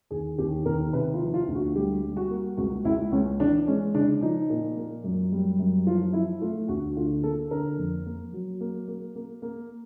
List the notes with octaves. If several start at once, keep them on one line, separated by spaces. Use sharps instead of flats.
D#2 G#4
D#2 G4
D#2 A#4
C3 B4
F4
F3
F4
D2
F#4
G3 G4
G3
F#4
A#3
C#2 F#4
C#2 E4
C#2 C#4
E3 D4
G#3 C#4
C#3 D4
F3 D#4
A#2
A#3
F#2
G3
F#2
F3 F4
F3 E4
A3 F4
D2 F#4
D3 F4
A#3 A4
D3 A#4
F2
A#3
F#3
A#3
A#3
A#3
A#3